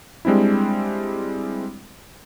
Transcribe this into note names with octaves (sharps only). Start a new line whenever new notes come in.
G3 G#3 C4 D4 E4